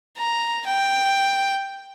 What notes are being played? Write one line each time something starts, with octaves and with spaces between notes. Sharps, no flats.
A#5
G5